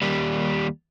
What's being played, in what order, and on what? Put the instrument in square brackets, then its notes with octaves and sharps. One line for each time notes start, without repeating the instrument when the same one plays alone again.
[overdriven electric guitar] D#2 G3